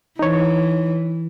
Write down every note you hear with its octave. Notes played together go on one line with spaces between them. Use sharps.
E3 D#4 C#5